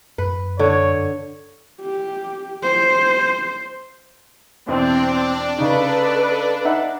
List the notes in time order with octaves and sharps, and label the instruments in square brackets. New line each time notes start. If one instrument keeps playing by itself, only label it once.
[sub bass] F#2 [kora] B4
[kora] D3 [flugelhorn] C#5
[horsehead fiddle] G4
C5
[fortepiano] E2 B2 [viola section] C4 [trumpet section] D4 D5
[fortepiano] C#3 D#4 [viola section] A4 B4
[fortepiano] D#4 E5 F#5